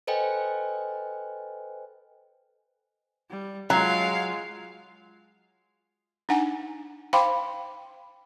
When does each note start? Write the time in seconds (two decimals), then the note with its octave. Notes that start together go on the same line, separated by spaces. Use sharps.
0.07 A4 B4 C5 D#5 G5 G#5
3.30 G3
3.70 F#3 G#3 F4 F5 A5 A#5
6.29 D4 D#4 F#5 G#5
7.13 C5 F5 G5 B5 C6 D6